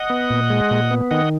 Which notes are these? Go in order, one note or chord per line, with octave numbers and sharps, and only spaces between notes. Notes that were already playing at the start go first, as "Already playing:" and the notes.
Already playing: D#5 F#5
B3
A#2
G#3
A#2
B3
D#3 D#5 F#5